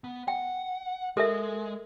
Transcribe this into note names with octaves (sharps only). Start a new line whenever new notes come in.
B3
F#5 G5
G#3 A4 A#4 E5